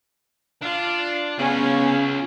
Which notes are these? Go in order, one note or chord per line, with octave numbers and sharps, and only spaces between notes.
D4 F4
C#3 B3 C#4 F4 G#4